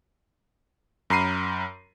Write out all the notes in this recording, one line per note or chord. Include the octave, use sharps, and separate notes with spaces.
F#2 A#5 B5 C7 D#7